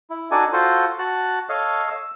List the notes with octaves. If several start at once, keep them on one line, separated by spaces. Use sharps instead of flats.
E4
D4 D#4 F#4 A4 D5 G#5
F4 F#4 A4 C5
F#4 A5 F#6
A4 C#5 D#5 F5
E6